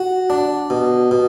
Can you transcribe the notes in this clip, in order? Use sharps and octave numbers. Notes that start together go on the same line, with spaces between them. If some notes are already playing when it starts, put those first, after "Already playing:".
Already playing: F#4
D4
B2
B2